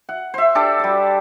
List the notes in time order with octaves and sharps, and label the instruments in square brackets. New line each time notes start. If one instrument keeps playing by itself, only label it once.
[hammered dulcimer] F#5
C5 E5
D4 G4 A4 D5
G3 D5